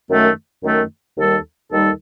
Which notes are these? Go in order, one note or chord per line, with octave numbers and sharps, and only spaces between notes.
F#2 D#3 A3
F#2 D#3 A3
D#2 D#3 G3 D#4 A4
D#2 D#3 G3 D#4 A4